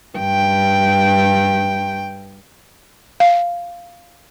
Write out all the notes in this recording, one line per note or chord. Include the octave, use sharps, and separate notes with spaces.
G2 G5
F5